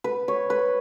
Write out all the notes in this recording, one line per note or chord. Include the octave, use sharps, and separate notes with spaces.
B4
C#5
B4